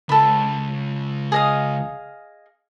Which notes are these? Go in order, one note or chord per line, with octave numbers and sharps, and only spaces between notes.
C#2 A4 B5
G#4 D#5 F5